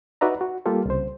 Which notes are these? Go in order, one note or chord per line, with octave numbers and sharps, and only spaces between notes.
D#4 F#4 B4 D5 E5 A#5
F#4
G3 A#3 F4 G4 A4
C2 C#3 C5